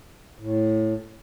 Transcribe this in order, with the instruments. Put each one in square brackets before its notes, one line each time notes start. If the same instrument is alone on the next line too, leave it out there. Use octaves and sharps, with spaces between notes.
[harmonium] A2